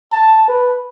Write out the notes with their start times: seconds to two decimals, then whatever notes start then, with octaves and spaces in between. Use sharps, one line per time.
0.13 A5
0.48 B4